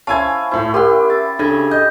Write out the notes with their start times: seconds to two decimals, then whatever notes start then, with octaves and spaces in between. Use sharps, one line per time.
0.07 C#4 E4 C5 F5 G#5 A5 G#6
0.51 A2 E4 C5
0.74 G4 A#4 F#5 C6 F6
1.10 E5 A6
1.39 C#3 D4 A4 G#6
1.71 D#5 G6